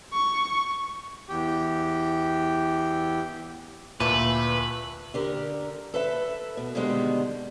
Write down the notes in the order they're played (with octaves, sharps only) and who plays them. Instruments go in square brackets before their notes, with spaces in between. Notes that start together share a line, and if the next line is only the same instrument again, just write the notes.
[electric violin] C#6
[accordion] E2 G4
[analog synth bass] D2 [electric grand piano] A#2 [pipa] E3 G3 A3 [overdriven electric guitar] B4
[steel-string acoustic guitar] D3 G4 A#4
A4 B4 E5
B2
B2 D3 D#3 G3 G#3 B3